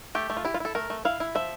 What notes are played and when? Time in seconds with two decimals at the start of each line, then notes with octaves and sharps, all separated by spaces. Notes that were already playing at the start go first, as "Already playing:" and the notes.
0.15 A3 G4
0.30 A3
0.37 F4
0.45 E4 G4
0.54 F4
0.60 E4 A4
0.75 A3 A#4
0.90 A3
1.05 E4 F5
1.20 E4
1.35 F3 E5